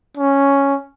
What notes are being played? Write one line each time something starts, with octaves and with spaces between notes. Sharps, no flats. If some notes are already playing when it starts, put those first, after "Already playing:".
C#4